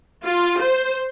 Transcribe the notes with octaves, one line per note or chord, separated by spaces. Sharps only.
F4
C5